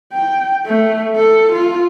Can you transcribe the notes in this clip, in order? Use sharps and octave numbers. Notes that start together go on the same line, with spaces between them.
G5
A3
A4
F4